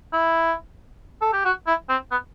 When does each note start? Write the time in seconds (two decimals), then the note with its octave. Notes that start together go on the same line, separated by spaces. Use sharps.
0.13 E4
1.22 A4
1.33 G4
1.45 F#4
1.67 E4
1.89 C4
2.11 B3